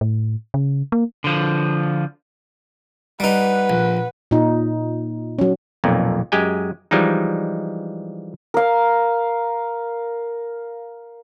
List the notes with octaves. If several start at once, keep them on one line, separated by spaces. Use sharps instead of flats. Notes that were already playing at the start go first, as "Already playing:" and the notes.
A2
C#3
A#3
D3 F3
G3 D#4 B4 F#5
A#1
A#2 D#4
F#3 C#4
B1 F2 A#2
F#2 G#3 G4 G5 G#5
E3 F3 G3 G#3 D#4
A#4 F5